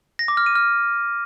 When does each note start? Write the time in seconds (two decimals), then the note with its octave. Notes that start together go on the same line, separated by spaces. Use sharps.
0.19 A#6
0.28 D6
0.37 F6
0.46 D#7
0.55 F6